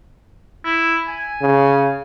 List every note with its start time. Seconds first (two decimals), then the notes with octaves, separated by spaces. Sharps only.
0.64 E4
1.08 G#5
1.41 C#3